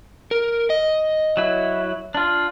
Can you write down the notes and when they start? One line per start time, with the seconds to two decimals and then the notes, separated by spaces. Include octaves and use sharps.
0.31 A#4
0.70 D#5
1.37 F#3 E4
2.15 D4 F4